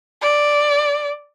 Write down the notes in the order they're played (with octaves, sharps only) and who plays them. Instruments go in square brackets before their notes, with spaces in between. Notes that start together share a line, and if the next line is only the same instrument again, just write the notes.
[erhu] D5